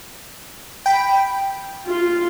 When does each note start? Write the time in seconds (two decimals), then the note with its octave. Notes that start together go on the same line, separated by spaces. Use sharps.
0.86 G5 B5 D7
1.86 F4